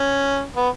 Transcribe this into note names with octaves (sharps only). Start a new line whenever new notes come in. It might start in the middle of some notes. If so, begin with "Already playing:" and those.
Already playing: C#4
B3